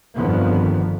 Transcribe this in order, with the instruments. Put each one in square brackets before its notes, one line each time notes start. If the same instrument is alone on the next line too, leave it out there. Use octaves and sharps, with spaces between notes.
[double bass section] G1 F2 D3 D#3 F3 B3